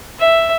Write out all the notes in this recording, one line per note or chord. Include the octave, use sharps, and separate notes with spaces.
E5